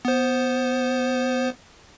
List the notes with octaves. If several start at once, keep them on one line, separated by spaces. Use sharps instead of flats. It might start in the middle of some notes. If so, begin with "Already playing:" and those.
B3 C5